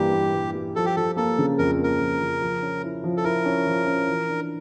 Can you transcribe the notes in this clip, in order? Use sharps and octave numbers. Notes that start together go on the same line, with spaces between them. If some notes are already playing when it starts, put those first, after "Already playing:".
Already playing: G2 E3 G3 A#3 G4
A#3
G2
G3
F3 A4
G4
F3 A4
A#3 A4
C#3
F2 A#4
A#3 A#4
F2
C#3
F3
C#4
E4
F3
A4
E4 A#4
C#4
F3
C#4
E3
D4